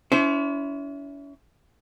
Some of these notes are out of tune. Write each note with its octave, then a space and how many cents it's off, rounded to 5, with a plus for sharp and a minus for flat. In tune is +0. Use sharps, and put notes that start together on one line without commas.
C#4 +40 E4 +0 C5 +0